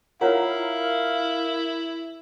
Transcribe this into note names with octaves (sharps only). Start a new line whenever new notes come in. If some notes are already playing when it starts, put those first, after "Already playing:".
E4 F4 A#4 C#5 F5 F#5